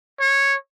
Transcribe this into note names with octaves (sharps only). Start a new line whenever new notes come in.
C#5